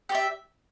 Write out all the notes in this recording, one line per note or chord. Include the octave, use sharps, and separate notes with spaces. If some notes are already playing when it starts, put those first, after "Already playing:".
G4 D5 E5